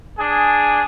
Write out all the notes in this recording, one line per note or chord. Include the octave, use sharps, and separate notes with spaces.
D4 G#4